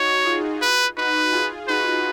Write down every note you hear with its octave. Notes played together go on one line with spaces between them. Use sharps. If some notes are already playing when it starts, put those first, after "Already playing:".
Already playing: D#4 F#4 C#5
F4 G#4
B4
D#4 F#4 B4
F4 G#4
D#4 F#4 B4